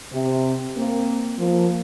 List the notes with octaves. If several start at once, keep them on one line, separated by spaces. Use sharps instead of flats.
C3
A#3 C4
F3 A#3